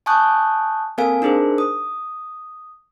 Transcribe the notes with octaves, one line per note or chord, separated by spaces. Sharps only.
G#5 A5 C#6 D#6 F#6 G6
A#3 C4 A4 A#4 F5 G#5
D4 D#4 G#4 A#4 C5
D#6